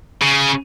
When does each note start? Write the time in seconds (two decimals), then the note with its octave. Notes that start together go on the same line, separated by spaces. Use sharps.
0.22 C#3